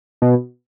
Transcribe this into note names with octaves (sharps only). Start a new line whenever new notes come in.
B2